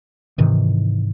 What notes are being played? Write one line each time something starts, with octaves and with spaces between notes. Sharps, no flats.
G#2 C3 D#3 E3